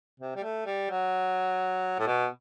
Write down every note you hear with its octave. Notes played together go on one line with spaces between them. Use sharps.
C3
G3
A3
G3
F#3
A2
B2